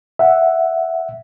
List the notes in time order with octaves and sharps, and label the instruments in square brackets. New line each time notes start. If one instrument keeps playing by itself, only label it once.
[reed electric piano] E5 F#5